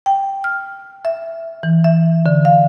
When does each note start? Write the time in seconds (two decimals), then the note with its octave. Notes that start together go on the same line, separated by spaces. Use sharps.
0.06 G5
0.44 F6
1.05 E5
1.63 E3
1.84 E5
2.26 D3
2.45 F5